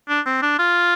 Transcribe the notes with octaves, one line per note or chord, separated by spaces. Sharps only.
D4
C4
D4
F4